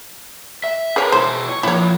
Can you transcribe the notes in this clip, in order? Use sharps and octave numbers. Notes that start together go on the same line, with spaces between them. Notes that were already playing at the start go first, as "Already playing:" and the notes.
E5
G#4 A#4 B4 C#5
B2 E4 C5
C#5
A#2 F3 E4 C#5